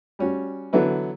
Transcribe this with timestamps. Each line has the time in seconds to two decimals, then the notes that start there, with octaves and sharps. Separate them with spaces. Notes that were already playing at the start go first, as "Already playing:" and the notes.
0.19 G3 C#4 F#4
0.73 D3 E3 F#3 B3 E4 B4